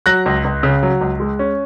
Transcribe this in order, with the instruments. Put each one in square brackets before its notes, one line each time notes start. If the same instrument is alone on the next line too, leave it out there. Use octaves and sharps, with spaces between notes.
[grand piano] F#3 F#6 A#6
C#2
C#2
C#3
F#3
C#2
G#3
C#4